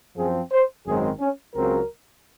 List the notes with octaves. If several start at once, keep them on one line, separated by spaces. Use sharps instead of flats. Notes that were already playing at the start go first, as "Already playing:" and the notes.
F#2 F3 C4 G#4
C5
G#1 F#2 D#3 G#3 C4 G#4
C#4
C#2 C#3 F#3 C4 A#4